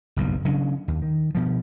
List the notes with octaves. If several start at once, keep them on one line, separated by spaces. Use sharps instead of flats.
F#1 B1 G2
C#3 F#3 C#4 D4
D#2
D#3
B2 F3